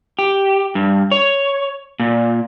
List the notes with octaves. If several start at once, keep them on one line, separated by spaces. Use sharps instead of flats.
G4
G2
C#5
A#2